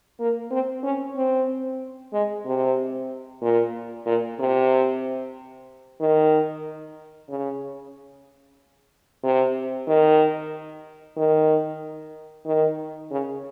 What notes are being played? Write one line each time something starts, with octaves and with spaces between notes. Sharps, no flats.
A#3
C4
C#4
C4
G#3
C3
A#2
A#2
C3
D#3
C#3
C3
D#3
D#3
D#3
C#3